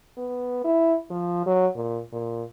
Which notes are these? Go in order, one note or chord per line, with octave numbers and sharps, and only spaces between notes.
B3
E4
F3
F#3
A#2
A#2